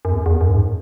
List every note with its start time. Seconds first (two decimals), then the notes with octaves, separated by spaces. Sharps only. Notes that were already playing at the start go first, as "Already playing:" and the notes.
0.05 F#2
0.10 E2
0.26 E2
0.41 F#2
0.49 G#2